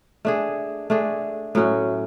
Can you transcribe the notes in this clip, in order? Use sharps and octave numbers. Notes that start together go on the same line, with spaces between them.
A3 D4 G#4
A3 D4 G#4
A2 F#3 C#4 F#4